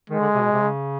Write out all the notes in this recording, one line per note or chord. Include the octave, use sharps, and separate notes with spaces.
D#3 G#3
D3
C3
B2
C3
C#3